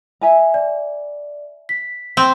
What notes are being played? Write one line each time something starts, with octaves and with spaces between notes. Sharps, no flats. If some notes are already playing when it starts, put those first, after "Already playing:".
E5 G#5 A#5
D5
B6
C4